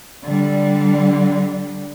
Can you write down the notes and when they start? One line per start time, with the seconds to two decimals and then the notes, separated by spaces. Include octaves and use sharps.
0.24 D3 G3